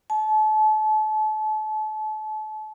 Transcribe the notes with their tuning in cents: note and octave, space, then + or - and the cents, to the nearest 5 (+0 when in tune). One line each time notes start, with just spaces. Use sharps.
A5 -35